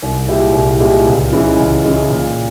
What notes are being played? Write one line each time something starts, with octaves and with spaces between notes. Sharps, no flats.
C2
A#2 G#3 E4 G4
C2
A#2 G#3 E4 G4
C#2
C#3 E3 G#3
C#2
C#3 E3 G#3
A#2